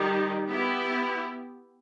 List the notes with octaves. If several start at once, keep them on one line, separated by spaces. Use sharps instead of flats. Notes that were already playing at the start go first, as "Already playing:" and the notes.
Already playing: D#3 G3 D#4 G4
B3 E4 G4